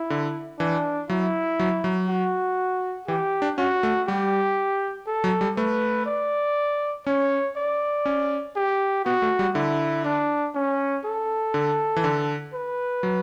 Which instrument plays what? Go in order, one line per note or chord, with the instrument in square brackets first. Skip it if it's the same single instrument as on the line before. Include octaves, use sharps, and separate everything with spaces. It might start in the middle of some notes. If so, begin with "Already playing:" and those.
Already playing: [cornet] E4
[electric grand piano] D3
[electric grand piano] E3 [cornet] D4
[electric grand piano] F#3 [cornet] E4
[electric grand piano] F#3
F#3
[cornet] F#4
[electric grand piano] E3 [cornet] G4
[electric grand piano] D4
[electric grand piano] C#4 [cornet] F#4
[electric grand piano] A3
[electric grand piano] G3 [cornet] G4
[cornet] A4
[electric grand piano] F#3
G3
[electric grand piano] A3 [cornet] B4
[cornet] D5
[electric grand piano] C#4 [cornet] C#5
[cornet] D5
[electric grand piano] C#4
[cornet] G4
[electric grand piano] B3 [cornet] F#4
[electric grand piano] A3
G3
[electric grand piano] D3 [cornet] E4
[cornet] D4
C#4
A4
[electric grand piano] D3
E3
D3
[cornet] B4
[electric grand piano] F#3